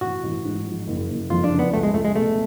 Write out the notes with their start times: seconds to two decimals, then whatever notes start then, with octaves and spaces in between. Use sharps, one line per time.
0.01 A1 F#4
0.23 A1
0.44 G#2
0.65 F3
0.87 F#1
1.09 F#1
1.30 F2 F4
1.44 D4
1.51 C#3
1.59 B3
1.73 C#2 A3
1.83 G#3
1.94 C#2 A3
2.05 G#3
2.15 B2 A3